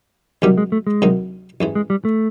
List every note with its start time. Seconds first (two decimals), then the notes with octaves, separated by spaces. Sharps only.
0.42 D2 C3 D#3 F#3 G3
0.58 G#3
0.72 A3
0.87 G#3
1.02 D2 C3 D#3 F#3
1.61 A1 G#2 E3
1.75 G#3
1.90 G3
2.05 A3